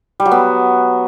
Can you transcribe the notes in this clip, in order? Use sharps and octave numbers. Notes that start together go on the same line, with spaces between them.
G3
F#3
B3